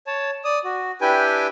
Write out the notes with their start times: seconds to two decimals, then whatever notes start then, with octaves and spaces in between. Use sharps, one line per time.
0.07 C#5 A5
0.44 D5 D#6
0.64 F#4
1.01 D4 E4 G4 B4 G5 G#5